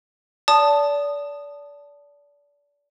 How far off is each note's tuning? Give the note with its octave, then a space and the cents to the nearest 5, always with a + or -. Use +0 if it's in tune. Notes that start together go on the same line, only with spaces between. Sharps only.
D5 -30 A5 +0 D#6 -15